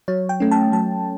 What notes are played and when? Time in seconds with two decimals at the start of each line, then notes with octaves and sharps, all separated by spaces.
0.08 F#3 C#5
0.29 G5
0.40 A3 C#4
0.51 A5
0.72 F#3 A5